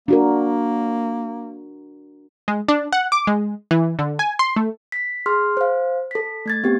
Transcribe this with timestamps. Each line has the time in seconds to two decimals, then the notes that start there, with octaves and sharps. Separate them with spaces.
0.08 A#3 D4 F#4 A#4
2.48 G#3
2.68 D4
2.93 F#5
3.12 D6
3.27 G#3
3.71 E3
3.99 D3
4.19 G#5
4.39 C6
4.56 A3
4.92 B6
5.26 G#4 C6 F6
5.57 C5 F5
6.11 A4 B6
6.46 A3 G#6 A6
6.64 B3 C4 G4